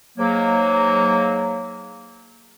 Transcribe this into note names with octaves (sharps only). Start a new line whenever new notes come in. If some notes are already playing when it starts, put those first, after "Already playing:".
G#2 F#3 A#3